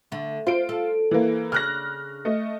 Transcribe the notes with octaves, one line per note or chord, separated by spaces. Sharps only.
D3 A3
F4 C5 D7
A4
E3 A#3
C#3 D4 F6 F#6 A#6
A3 D#5